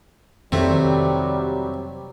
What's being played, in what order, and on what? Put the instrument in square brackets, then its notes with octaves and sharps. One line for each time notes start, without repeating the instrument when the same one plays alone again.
[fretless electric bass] F2 D#3 [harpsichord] C3 A3 [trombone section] F#3 G3